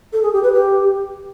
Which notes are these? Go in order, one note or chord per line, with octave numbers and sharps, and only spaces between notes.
A4
G#4
G4
B4
G4